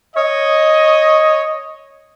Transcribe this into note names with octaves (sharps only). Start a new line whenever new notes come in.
C#5 D#5